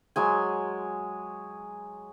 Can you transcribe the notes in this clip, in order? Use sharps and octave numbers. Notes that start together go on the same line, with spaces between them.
F#3 G#3 G#5